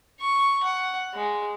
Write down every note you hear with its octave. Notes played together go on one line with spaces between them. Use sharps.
C#6
F#5
G#3